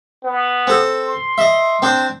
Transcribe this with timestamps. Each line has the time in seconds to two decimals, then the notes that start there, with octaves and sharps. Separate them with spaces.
0.24 B3
0.67 C4 A4
1.04 C6
1.38 D#5 E5
1.82 C4 D4 C5